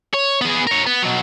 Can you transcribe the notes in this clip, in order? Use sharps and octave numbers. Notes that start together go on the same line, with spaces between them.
C#5
B3 G#4
A#4 C#5
B3
B2 F#3